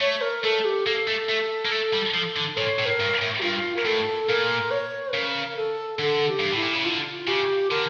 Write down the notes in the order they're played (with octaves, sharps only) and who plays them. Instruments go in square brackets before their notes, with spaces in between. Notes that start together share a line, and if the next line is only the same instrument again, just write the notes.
[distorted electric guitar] A3 [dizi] C#5
[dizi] A#4
[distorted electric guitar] A3 [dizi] A4
[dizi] G4
[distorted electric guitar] A#3 [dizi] A4
[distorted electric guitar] A3
A3
A#3
A3
G3
F3
D3
[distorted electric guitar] A#2 [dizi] C#5
[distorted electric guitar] A2
[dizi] A#4
[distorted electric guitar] G2
A2
[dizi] G4
[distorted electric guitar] G2 [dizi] F4
[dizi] A#4
[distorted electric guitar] A2 [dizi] A4
[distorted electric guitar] A#2 [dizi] A#4
[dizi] C#5
[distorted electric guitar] C#3 [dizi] A#4
[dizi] A4
[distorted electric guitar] D3 [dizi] A4
[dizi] G4
[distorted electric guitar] G2
[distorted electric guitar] A2 [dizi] E4
[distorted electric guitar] A#2
C#3
[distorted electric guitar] D3 [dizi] F4
[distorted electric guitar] C#3 [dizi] G4
[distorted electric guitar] D3 [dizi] A#4